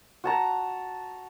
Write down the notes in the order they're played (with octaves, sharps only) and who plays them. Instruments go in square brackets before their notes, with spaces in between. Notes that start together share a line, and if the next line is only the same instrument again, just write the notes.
[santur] F#4 A5 A#5